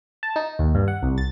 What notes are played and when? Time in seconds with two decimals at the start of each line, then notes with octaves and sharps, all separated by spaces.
0.23 A5
0.36 D#4
0.59 D#2
0.75 G2
0.88 F#5
1.03 C2
1.18 A6